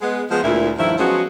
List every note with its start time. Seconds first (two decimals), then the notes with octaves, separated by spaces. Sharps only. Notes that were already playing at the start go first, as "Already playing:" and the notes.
0.01 G#3 B3
0.31 F3 G#3 B3
0.44 D2 A#2 E4
0.78 G2 D#3 F3 A3 E4
0.98 F3 F#3 G#3 B3 C#4 F#4